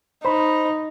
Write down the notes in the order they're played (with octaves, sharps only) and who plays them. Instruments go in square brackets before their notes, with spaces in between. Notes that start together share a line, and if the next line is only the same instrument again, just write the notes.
[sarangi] D#4 [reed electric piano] C5 B5